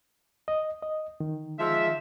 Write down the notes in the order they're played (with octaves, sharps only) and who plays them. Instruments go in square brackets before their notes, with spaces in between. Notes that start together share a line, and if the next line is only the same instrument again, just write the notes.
[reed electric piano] D#5
D#5
D#3
[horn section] F3 G#3 E5